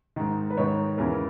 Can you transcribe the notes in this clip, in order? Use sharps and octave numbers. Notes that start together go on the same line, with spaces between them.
G#2 D#3
B4
G#2 D#3 C#5
E2 C#3 E3 A#4